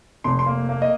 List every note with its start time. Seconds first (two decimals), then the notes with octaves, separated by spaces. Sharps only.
0.24 F1 C6
0.39 C6
0.46 A#3
0.69 A#3
0.82 D#5